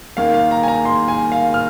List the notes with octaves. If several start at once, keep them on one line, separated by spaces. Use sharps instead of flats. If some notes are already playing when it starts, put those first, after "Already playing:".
D#2 D#3 A#3 F5
F5
A#5
G#5
A#5
C6
G#5
F5
F6